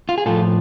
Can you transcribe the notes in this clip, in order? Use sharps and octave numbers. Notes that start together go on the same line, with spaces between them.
F4
G#4
A2 F3 F4 A4